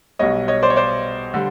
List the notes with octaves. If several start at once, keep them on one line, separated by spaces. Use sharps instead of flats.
B1 B2 G3 C#5 D#5
C#5 D#5
C5 D5
C#5
C5 D5
D3 G3